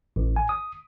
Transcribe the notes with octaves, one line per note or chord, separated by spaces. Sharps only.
A1
G#5
D#6